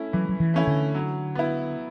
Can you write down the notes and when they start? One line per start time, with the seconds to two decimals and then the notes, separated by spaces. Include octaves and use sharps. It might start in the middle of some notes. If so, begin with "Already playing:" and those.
Already playing: A3 C#4 E4
0.13 E3 F#3
0.29 F#3
0.40 E3
0.54 A3 C#4 E4
0.67 D3
0.95 F#3
1.35 B3 E4